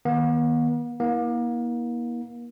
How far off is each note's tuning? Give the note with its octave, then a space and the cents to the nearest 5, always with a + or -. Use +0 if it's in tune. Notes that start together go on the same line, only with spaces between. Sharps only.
D#3 +0 B3 -45
A#3 +35 E4 -40